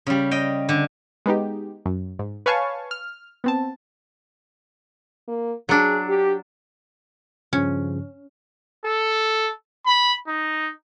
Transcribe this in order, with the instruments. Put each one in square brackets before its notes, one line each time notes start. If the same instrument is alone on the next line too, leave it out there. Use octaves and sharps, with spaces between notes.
[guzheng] C#3 G3
D#5 G5
D3
[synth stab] G#3 B3 D#4 G4
F#2
G#2
B4 C#5 F5 G#5 A5 C#6
F6
B3 C4 A5
[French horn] A#3
[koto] F#3 D4 [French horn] G#4
[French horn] G4
[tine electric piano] G2 C#3 F3 [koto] C#4
[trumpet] A4
B5
D#4